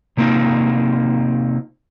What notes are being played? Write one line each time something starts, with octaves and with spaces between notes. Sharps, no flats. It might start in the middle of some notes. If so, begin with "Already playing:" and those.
C3 A#3 C4 D#4 F4